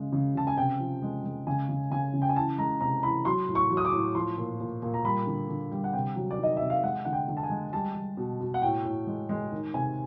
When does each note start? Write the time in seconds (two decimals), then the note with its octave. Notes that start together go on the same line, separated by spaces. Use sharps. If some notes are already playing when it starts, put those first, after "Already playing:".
Already playing: C#3 G#3
0.12 C#3
0.35 C#3 A5
0.47 G#5
0.57 C3 G5
0.80 F3
1.02 G#3
1.24 G#3
1.47 C#3 G#5
1.69 C#3
1.91 C#3 G#5
2.13 C#3
2.22 G5
2.29 G#5
2.36 E3 A5
2.58 G#3 A#5
2.81 C3 A#5
3.03 E3 B5
3.25 F#3 C6
3.48 A2
3.55 C#6
3.70 F#3
3.77 D#6
3.85 D6
3.92 A2
4.15 F3 C6
4.37 A#2
4.60 A#2
4.82 A#2
4.94 A#5
5.05 G3 B5
5.27 D3
5.49 D3
5.71 G3
5.84 F#5
5.93 C3 G5
6.16 F#3
6.31 D5
6.39 D#3 D#5
6.57 C3 E5
6.70 F5
6.83 G#3 F#5
7.05 D3 F#5
7.13 G5
7.28 D3
7.37 A5
7.43 G#5
7.50 G#3
7.73 G3 A5
7.94 G3
8.17 B2
8.40 B2
8.54 F#5
8.62 A2 G5
8.84 A2
9.07 G#3
9.29 G#3
9.52 D#3
9.74 C3 G#5